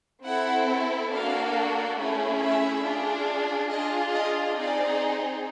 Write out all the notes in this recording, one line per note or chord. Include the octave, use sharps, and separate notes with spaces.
C4 E4 A4 F#5
A#3 D4 F#4 A4 F5
A3 C#4 E4 G#4
E5
D4 F4 G#4
D4 F4 G#4 D#5
D#5
C4 D#4 G#4 D5